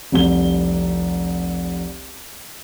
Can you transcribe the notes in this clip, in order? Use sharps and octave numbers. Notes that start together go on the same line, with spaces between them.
F1 C2 G7